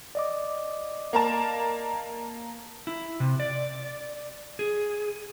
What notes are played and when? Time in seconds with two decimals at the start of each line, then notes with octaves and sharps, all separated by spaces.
0.15 D5 D#5 D6
1.13 A#3 A#4 A5
2.87 E4
3.20 C3
3.40 D5
4.59 G#4